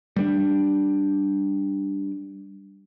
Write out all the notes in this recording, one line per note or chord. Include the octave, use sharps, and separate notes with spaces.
G3 A3 D4